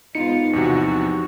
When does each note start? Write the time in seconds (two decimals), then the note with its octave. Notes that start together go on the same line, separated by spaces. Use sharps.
0.15 G#2 B3 D#4 F4 C#7
0.53 E2 C3 F3 F#4